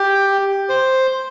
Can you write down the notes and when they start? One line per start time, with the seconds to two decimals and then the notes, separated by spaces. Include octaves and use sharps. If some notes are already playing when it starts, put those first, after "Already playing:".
Already playing: G4
0.69 C5